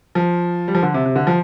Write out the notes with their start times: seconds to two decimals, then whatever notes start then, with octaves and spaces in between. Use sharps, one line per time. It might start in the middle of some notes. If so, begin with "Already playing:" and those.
0.15 F3
0.68 G3
0.75 F3
0.83 D3
0.94 C3
1.06 C3
1.16 D3
1.27 F3